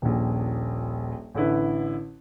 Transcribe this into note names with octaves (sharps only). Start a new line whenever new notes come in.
D#1 A#1
A1 D3 E4 B4